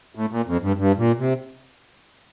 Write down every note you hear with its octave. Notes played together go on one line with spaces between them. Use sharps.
A2
A#2
F2
G2
G2
A#2
C3